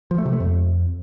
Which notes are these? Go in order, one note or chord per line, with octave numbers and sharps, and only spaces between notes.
F3
A3
C3
A3
F2